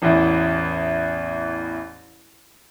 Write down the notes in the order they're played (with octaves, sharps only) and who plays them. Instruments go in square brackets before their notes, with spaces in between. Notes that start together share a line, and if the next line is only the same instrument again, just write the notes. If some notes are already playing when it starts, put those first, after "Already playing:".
[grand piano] A1 E2 E3